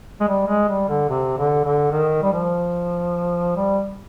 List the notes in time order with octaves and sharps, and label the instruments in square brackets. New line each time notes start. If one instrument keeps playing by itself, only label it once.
[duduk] G#3
G3
G#3
G3
D3
C3
D3
D3
D#3
G3
F3
G3